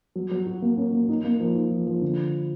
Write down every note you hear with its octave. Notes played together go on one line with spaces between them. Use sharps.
F#3
F#3
F#4
A#3
C#4
A#3
D#4
A#3
F3
D#4
F3
F3
D3